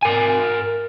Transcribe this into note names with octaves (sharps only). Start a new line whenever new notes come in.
A#4 G#5